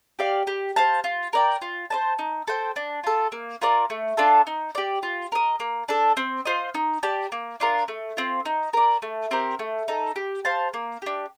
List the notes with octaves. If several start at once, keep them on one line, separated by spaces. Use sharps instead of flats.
G4 D5 F5
G4
C5 F5 A5
F4
A#4 D5 G5
F4
C5 D#5 A5
D#4
A4 C5 G5
D4
F4 A4
A#3
F4 A#4 D5
A3
D4 F4 A4
D#4
G4 D5
F4
A#4 D#5
A#3
D4 A4
C4
F4 C5 D#5
D#4
G4 D5 A5
A#3
D4 F4 A#4
A3
C4 F4
D#4
A#4 D5
A3
C4 G4 A#4
A3
D#4 A4
G4
C5 F5 A5
A#3
D4 G4